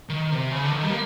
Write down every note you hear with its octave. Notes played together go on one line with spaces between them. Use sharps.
D#3
C3
C#3
D3
D#3
G3
A#3